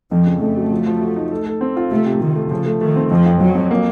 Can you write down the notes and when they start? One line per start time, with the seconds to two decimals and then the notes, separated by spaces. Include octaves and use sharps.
0.11 F2 F3
0.27 C#3
0.42 F2 A3
0.56 F#3
0.71 F3
0.86 F3
1.01 F#4
1.16 D#4
1.31 A4
1.46 A4
1.61 C4
1.76 F4
1.91 C3 A3
2.06 C3
2.21 C3 D#3
2.36 A3
2.51 C#3 F3
2.66 A3
2.81 D#3 A3
2.96 C4
3.11 F2 F3
3.26 F2
3.41 F2 F#3
3.55 F2
3.71 A#3